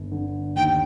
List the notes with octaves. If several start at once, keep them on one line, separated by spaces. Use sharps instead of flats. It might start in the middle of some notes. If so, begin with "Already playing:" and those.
Already playing: G1
D3
D#2 G5